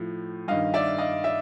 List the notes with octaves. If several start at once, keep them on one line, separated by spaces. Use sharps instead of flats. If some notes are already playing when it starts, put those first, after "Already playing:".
Already playing: A2 F3
G2 D#3 D#5 F5
D5 E5
D#5 F5
D5 E5